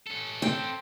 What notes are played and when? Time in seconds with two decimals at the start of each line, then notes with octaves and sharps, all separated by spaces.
0.07 C#4 A4
0.42 C4 G5